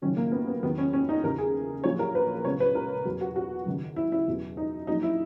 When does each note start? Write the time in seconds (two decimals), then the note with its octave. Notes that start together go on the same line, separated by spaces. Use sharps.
0.02 F#1 F#2 D#3 F#3 C#4
0.17 A#3
0.32 B3
0.47 B3
0.63 E2 D#3 F#3 B3
0.78 C#4
0.93 C#4
1.09 D#4
1.23 E2 C#3 E3 A#4
1.38 G#4
1.84 A#1 A#2 F#3 C#5
1.99 A#4
2.15 B4
2.45 C#2 B2 F#3 C#5
2.60 B4
2.75 A#4
3.05 E2 B2 F#3
3.21 F#4
3.36 F#4
3.66 F#1 F#2 D#3 F#3
3.96 E4
4.12 E4
4.28 E2 B2 F#3
4.57 D#4
4.87 A#1 A#2 F#3 D#4
5.03 E4